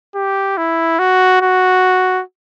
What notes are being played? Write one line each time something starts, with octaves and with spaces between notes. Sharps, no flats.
G4
E4
F#4
F#4